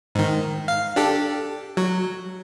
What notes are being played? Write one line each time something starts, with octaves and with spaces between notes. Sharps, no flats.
G#2 D#3
F5
D4 G4 A4
F#3